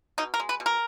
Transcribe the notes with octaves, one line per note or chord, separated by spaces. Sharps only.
B2 D#4
A#4
G#3
B4
B2
A#4